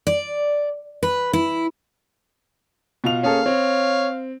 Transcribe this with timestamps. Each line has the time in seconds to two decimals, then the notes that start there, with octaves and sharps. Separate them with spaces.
0.07 D5
1.03 B4
1.33 E4
3.04 B2 F4 F7
3.23 A#3 C#4 G#4 A4 F5
3.46 C4 C#5